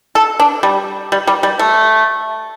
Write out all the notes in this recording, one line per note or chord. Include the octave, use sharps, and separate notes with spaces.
A4
D4
G3
G3
G3
G3
A3